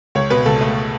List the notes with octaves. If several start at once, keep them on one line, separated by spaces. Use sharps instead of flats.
C#2 C#5
B2 B4
C#2 A4
A3